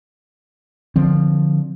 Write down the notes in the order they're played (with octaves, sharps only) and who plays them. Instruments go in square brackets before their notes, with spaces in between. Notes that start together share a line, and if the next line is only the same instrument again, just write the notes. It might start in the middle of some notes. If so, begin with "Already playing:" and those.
[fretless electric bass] D3 F3 C4